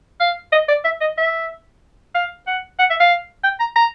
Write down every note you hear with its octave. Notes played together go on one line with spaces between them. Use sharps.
F5
D#5
D5
E5
D#5
E5
F5
F#5
F#5
E5
F5
G5
A#5
A#5